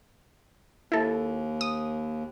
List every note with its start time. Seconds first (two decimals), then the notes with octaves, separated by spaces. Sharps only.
0.92 D#2 E4 A4
1.61 D#6